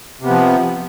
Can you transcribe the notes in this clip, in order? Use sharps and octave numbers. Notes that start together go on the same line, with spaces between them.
C3 F3 B3